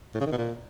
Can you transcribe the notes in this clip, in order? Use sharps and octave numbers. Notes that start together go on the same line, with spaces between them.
A2
C#3
D#3
B2
A#2